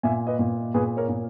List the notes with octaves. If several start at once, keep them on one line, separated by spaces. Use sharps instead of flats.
A#2 E5 G#5
B4 D#5
A#2
A#2 G#4 B4
A#4 C#5
A#2